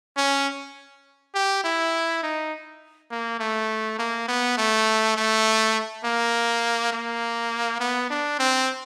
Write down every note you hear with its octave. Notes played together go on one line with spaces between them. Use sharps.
C#4
G4
E4
D#4
A#3
A3
A#3
B3
A3
A3
A#3
A#3
B3
D4
C4